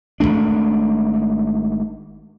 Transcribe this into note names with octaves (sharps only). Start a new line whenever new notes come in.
G#1 F2 A3 D4